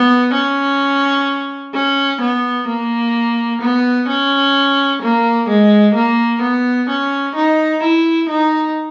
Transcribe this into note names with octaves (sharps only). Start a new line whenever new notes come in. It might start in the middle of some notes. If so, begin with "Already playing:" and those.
Already playing: B3
C#4
C#4
B3
A#3
B3
C#4
A#3
G#3
A#3
B3
C#4
D#4
E4
D#4